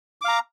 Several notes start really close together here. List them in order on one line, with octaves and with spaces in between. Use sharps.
D6 F5 A#5